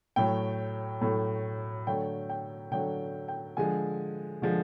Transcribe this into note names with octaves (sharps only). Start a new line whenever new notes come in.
A2 F#3 A3 G5
A2 F#3 A3
D3 F#3 A3 G5
G5
D3 F#3 A3 G5
G5
D3 F3 G#3 G#5
D3 F3 G#3